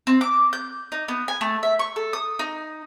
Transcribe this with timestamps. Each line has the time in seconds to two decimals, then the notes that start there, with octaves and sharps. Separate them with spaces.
0.07 C4
0.21 D6
0.53 G6
0.92 D#4
1.08 B3
1.28 G#5
1.41 A3
1.63 E5
1.79 C#6
1.96 A4
2.13 D#6
2.39 D#4